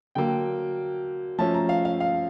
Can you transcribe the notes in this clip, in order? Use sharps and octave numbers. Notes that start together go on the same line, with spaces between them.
D3 F#3 A#3 G5
F3 A3 C#4 A5
A#5
F5
F5
F5